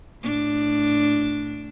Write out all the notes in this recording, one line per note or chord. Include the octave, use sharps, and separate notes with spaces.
A2 D4